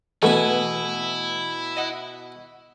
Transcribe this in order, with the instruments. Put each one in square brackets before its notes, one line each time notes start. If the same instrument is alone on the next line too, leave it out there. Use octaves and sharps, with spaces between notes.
[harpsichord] B2 G#5 [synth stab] E3 A3 B3 [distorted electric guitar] E4 [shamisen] A4 B4
[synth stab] D#5 F#5